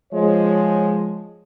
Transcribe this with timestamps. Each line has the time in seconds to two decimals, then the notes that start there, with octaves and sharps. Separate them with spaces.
0.13 F3 G#3 C#5